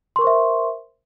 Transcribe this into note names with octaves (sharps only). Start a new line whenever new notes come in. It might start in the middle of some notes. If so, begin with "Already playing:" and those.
A#4 C5 E5 C6 C#6